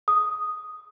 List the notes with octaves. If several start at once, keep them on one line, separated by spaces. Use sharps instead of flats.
D#6